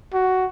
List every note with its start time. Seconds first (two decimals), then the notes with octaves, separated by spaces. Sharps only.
0.14 F#4